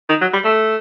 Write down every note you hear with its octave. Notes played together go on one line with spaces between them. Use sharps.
D#3
F#3
G3
A3